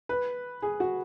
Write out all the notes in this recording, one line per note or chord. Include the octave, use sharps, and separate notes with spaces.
B4
G#4
F#4